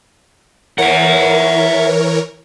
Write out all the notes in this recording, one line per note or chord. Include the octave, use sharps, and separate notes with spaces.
E3 A#4 C#5 E5 F#5